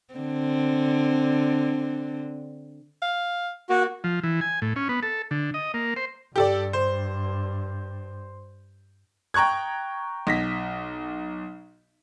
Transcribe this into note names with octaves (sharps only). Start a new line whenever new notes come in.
D3 C4
F5
A#3 F#4
F3
E3
G#5
A2
C#4
B3
A4
D3
D#5
A#3
C5
G2 G4 A4 D5
C5
G5 A#5 C#6 F#6 G#6
B1 A#6 B6